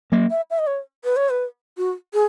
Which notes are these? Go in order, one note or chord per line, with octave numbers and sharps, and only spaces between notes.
F#3 A#3
E5
E5
D#5
C#5
B4
C#5
B4
F#4
G#4